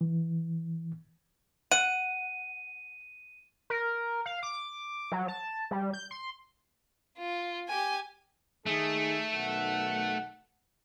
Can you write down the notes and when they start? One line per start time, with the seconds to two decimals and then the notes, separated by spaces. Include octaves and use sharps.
0.01 E3
1.71 F#5 D#7
3.70 A#4
4.26 F5
4.43 D6
5.12 F#3
5.28 A5
5.71 G3
5.94 G6
6.11 C6
7.18 F4
7.69 G4 G#5
8.66 D#3 A3 D#4 G#4
9.33 B1 D#3 F#5